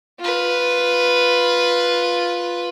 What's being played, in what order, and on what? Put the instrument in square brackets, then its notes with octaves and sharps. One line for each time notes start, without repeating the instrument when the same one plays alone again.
[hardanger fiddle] F4 B4